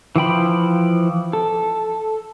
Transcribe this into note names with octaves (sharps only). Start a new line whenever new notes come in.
E3 F3 G5 B5
A4